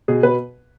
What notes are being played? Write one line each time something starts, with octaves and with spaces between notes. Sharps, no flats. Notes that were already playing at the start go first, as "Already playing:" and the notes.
B2 G#4
B2 B4